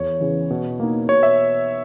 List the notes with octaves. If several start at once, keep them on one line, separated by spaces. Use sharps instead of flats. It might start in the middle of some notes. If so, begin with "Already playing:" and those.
Already playing: E2 C#5
C#3 E3
B2
A#3 D#4
B2 C#5
E5